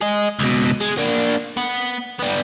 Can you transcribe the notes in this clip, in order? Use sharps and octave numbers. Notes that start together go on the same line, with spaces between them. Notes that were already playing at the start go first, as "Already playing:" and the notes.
G#4 D#5
C#2 B2
G#3
A#3 D4
B3
G3 B3